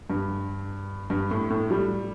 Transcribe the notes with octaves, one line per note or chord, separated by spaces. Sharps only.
G2
G2
A2
A2
G3